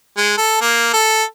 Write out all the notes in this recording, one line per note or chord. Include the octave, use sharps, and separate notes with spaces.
G#3
A4
A#3
A4